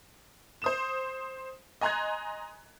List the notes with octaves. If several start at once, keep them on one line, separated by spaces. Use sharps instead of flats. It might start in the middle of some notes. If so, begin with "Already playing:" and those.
C5 D#6 E7
D#5 G#5 A#5 C6 F#6 G#6